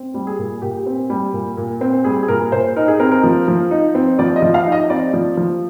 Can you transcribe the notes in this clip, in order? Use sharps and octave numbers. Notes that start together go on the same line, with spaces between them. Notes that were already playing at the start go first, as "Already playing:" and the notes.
Already playing: C4
G3
G#4
A#2
A#2 G4
C4
G3
A#2
A#2
C4
G3 G#4
G#4
A#2 A#4
A#2 C5
D#4 A#4
G#4
C4 A#4
A#4
F3
F3
D#4
C4
F3 D5
D#5
F3
F5
D#4
D#5
C4 D5
F3
F3